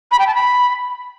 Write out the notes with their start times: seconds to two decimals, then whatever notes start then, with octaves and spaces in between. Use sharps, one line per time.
0.12 B5
0.19 G5
0.27 A5
0.35 B5